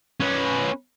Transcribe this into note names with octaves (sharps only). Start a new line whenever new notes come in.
C#4 B4